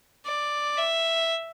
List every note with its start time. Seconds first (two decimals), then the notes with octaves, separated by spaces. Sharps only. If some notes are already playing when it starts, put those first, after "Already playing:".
0.25 D5
0.77 E5